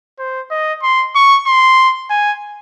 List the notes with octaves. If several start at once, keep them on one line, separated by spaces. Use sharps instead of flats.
C5
D#5
C6
C#6
C6
G#5